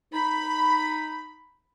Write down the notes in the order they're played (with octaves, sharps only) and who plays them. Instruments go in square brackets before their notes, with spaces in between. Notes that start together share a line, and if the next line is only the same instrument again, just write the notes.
[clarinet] D#4 [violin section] B5